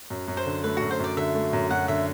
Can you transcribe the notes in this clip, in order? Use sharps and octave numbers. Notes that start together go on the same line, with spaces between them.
F#2
F#2
C5
D3
A3 B4
F#2 F#4
C5
F#2 D5
D3 E5
A3
F#2
F#2 F#5
D3 E5